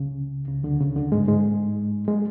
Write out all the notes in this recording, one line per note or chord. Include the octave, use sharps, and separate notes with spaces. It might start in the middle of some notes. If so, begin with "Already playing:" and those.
Already playing: C#2 C#3
C#2 C#3
D2 D3
C#2 C#3
D2 D3
G#2 G#3
G#2 G#3
G#3